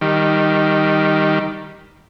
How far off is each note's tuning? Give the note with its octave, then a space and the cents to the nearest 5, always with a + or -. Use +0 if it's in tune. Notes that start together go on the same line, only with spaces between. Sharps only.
D#3 +0 G3 +0